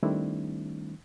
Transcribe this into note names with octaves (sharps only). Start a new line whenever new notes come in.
D#3 G3 A3 C4 D4 E4